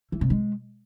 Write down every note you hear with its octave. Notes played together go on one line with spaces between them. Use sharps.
E3
C3
G#3